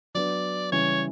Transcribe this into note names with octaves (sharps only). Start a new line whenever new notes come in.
F#3 B3 D4 D5
C#3 E3 G3 C#5